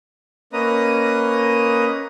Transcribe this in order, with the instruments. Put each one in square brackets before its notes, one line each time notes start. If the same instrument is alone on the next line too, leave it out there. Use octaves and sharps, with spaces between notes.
[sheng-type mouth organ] A#3 C#4 B4 D#5 A#5 D#6